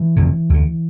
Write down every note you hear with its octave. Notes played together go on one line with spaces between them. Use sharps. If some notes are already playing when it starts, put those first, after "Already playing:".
Already playing: E3
F1 F2 D3
D2 D3